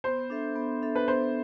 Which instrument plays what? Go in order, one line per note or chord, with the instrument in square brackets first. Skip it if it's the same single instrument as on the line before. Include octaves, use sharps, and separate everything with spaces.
[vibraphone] B3 [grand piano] C5
[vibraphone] D4 A4 E5
B3
D4 A4 E5
[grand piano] B4
[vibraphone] B3 [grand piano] C5